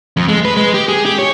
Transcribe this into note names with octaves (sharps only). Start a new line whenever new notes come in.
F2
G#3
B4
G#3
G4
G#4
G4
C#5